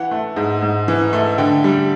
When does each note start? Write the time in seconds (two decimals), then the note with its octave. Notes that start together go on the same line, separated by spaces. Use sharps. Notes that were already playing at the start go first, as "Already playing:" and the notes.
Already playing: E3 F#5
0.11 A3
0.36 G#2
0.62 G#2
0.88 E3
1.13 A3
1.38 D3 G5
1.64 G3